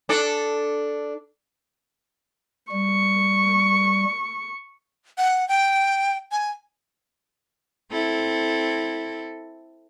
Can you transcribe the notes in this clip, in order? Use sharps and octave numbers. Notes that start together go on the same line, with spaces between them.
D4 A4 D5
G3 C#6
F#5
G5
G#5
C4 E4 A4